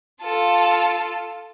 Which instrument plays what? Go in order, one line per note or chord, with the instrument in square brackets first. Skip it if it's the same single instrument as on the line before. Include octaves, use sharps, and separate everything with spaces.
[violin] F4 A4